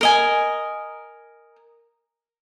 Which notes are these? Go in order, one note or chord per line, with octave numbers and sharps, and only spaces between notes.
A#4 D#5 G#5